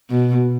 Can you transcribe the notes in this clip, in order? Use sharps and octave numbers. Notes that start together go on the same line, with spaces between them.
B2